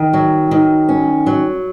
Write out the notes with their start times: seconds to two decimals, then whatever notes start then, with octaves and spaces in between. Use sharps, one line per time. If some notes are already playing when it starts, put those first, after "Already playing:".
Already playing: D#3
0.13 F#3
0.51 D#3
0.89 C#4
1.26 F#3